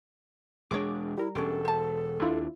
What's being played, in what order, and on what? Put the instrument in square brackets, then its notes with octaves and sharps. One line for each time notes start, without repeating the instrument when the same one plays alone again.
[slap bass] E1 G#3 D4 [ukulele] G#4 C#5 [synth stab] D6
[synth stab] G3 A#4 [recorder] E4
[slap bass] E1 [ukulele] C#4 D4 G4 [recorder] A4
[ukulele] C5 A5
[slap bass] D#2 D4 [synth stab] E4 F4